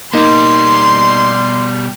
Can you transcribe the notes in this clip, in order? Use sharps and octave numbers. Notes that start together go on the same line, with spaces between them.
B2 G3 A#3 D#4 C6